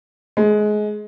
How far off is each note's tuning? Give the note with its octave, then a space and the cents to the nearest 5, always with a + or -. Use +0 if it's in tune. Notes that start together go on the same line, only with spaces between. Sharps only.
G#3 +20